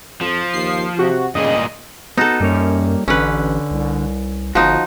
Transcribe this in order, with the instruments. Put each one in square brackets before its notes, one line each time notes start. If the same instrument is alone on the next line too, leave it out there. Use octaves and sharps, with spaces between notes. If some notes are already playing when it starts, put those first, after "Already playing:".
[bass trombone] F2 [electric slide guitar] F3
[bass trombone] D#2 [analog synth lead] C7
[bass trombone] C3 [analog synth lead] F#4
[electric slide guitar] G2 A#2 G#4 [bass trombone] C#3 [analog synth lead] D#5
[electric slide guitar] B3 F#4 [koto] D#4 A4
[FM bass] F#2 [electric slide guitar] G3 A#3 C#5
[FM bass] A1 [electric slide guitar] D3 [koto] C#4 B4
[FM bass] C2
[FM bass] G1 [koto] F3 D#4 [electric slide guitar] F#4